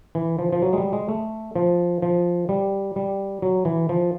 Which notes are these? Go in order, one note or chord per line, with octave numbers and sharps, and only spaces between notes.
E3
F3
F3
F#3
G#3
G3
G#3
A3
F3
F3
G3
G3
F#3
E3
F3